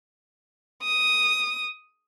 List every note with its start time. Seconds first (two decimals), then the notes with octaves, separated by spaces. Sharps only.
0.84 D#6